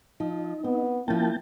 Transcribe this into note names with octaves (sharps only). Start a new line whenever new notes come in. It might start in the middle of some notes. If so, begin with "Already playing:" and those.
F3 D#4
B3 C4
F3 A#3 C#4 E4 G5 A5